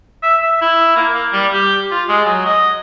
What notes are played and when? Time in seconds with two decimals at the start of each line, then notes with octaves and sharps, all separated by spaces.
0.23 E5
0.43 E5
0.61 E4
0.96 A#3
1.14 A#3
1.33 G3
1.53 G4
1.91 F4
2.09 G#3
2.25 F#3
2.45 D#5